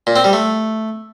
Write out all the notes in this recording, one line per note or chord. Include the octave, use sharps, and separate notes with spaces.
A#2
C4
G3
A3